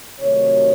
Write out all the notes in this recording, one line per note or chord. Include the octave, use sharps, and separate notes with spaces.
C3 D#3 F#3 A3 C#5